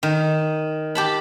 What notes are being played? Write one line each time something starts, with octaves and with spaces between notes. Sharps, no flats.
D#3
G4 A5 B5